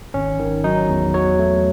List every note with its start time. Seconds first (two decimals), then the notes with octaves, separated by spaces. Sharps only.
0.14 G#1 C#4
0.39 D#3
0.64 F#3 D#4
0.89 E2
1.14 F#3 C#5
1.39 A3